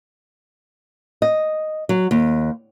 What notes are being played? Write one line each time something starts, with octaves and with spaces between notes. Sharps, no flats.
D#5
F#3
D#2